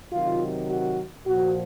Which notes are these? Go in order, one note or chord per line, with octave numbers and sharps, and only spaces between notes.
C3 D#3 F#3 F4
F#4
A#2 F3 F#4